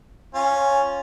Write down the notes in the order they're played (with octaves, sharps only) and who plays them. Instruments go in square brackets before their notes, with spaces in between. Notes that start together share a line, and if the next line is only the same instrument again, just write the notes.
[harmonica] C#4 F4